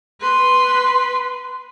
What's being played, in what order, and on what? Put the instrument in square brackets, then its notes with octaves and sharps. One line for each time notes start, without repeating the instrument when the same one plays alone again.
[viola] B4 C6